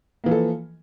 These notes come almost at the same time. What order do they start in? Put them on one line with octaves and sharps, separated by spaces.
A#3 E3 F3 A4